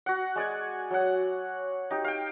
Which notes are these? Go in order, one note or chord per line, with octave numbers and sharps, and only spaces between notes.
F#4 F#5
G#3 D5 G#5
F#3 F#5
D#4 G4
F5 G5